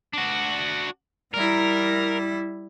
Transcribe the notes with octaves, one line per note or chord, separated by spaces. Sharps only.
D4 F#4
G3 E4 A#4